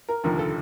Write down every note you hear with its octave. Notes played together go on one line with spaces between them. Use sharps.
A#4
F1 D#2 D3 F3 A#4
A4